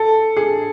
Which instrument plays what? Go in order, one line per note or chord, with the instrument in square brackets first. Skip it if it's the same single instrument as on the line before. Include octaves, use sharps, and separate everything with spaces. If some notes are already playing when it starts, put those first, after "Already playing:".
Already playing: [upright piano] A4
G#4